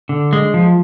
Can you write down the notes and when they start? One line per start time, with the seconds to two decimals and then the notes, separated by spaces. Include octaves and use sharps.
0.09 D3
0.33 G#3
0.54 F3